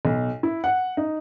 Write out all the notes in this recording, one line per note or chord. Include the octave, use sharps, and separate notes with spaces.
B1
E4
F#5
D#4